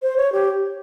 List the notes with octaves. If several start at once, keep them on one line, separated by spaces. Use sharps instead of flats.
C5
C#5
G4